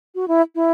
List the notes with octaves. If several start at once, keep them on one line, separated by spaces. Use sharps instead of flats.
F#4
E4
E4